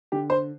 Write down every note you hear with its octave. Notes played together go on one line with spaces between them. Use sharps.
D3 G4
C5